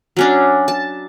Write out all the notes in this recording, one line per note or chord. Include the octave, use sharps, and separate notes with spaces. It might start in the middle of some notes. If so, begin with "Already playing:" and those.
F#3 C#4 D4
A5